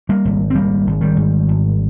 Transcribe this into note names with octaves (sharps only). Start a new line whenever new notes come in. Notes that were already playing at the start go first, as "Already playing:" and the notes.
G3 A#3
G#1
C4
G#1 G3 A#3
G#1
D#3 G3
G#2
G#1